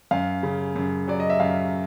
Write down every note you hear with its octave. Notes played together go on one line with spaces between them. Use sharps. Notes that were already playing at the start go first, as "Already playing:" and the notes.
F#2 F5
C#3
F#2
F#3 D5
D#5
E5
F#2 F5